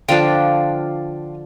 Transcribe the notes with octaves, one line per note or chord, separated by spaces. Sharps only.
D3 F3 D4 F4 G5